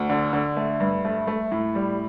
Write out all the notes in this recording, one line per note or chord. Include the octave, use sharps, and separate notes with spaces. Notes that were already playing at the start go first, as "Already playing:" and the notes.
Already playing: D2
D3
D3
A3
G2
A3
A3
A2
G3